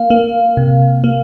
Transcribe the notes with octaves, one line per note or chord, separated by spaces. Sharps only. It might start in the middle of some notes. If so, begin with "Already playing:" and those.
Already playing: A#3 F5
A#3
C3
A#3